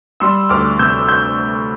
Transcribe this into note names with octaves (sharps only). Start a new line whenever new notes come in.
G3 C6 E6
D2 D6 F6
C3 E6 G6
E6 G6